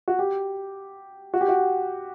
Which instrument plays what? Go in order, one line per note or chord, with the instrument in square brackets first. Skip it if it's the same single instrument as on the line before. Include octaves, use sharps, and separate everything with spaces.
[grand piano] F#4
G4
F#4
G4
F#4